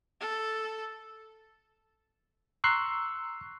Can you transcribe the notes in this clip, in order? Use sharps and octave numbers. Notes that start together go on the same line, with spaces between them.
A4
A#5 C6 C#6 E6 F#6 C7